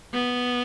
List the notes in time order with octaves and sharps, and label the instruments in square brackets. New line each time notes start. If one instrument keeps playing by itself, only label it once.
[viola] B3